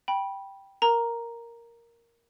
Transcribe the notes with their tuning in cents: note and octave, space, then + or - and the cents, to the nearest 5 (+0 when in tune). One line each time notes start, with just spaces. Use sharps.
G5 +0 B5 -20
A#4 +0 A#5 +0